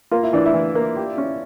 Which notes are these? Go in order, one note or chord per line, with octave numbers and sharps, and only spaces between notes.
A#3 F4
E4
E3 D4
E4
E3
A#3
G4
C#4